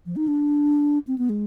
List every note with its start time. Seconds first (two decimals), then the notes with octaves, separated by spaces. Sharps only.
0.06 F3
0.16 D#4
0.28 D4
1.07 C4
1.18 B3
1.29 G#3